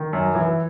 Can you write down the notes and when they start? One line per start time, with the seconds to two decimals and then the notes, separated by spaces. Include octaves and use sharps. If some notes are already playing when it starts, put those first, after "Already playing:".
Already playing: D#3
0.13 F#2
0.35 E3